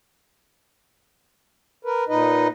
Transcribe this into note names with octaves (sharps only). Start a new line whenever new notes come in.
A#4 B4
A#2 D#4 B4 D#5